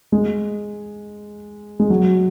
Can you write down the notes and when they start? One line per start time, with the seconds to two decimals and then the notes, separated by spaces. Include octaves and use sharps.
0.12 G#3
1.80 G#3
1.90 F#3